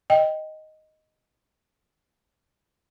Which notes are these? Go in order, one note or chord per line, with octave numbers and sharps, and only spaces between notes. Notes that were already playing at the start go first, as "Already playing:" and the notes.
D#5 G5